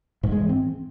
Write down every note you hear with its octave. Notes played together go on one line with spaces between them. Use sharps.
G#2
G#3
E3
C4